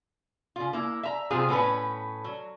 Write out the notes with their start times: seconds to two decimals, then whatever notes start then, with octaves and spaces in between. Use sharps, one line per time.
0.56 C#3 F4
0.73 A#3 E4
1.03 E5 A#5
1.30 C3 F#3 C4 F4 G#4
1.49 A2 B3 C#4 B4
2.24 F#3